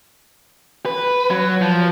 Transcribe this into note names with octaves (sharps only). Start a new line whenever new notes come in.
B4
F#3
F3